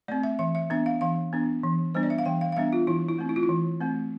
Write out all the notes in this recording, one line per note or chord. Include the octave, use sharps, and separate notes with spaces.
A3 C4 D5
E5
E3 E5
E5
B3 D4 E5
F5
E3 F5
B3 D4
E3
G3 B3 D4 C5
D5
E5
F5
E3 G5
F5
F5
G3 B3 D4 E5
F4
E3 E4
E4
A3 C4
E4
F4
E4
E3
A3 C4